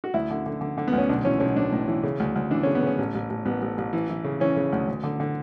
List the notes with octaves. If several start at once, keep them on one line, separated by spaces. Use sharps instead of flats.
F#4
D2 E4
D3
D3
D3
D3
B3
D2
C#4
B1 D4
E3 C#4
B1 C#4
A2 D4
A2
E3
C#3
D2
D2
E3 D4
C#3 C#4
B3
C#3 C#4
A1
A1
A1
A1 B3
A1
A1
E3
E3
C#3
E3 C#4
C#3
D2
D2
D3
D3